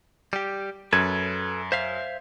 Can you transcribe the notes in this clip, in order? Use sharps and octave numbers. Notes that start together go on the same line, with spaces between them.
G3 G4
F#2 A4 B4 G#6
C5 E5 F5